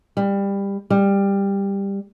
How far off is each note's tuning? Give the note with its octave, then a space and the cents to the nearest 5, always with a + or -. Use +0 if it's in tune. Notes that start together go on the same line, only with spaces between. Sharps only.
G3 +20
G3 +15